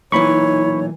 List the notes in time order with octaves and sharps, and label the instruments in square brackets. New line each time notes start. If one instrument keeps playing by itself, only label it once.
[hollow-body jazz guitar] B1 A#2 E3 [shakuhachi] D#4 [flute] C#5 [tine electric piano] B5 C#6